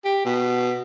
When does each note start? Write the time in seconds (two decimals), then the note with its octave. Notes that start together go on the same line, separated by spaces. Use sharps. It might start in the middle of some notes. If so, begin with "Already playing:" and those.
0.05 G4
0.25 B2